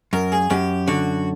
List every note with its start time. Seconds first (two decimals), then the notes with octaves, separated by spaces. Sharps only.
0.13 F#2 A#4
0.32 G#4
0.50 F#2 G4
0.88 D3 F#4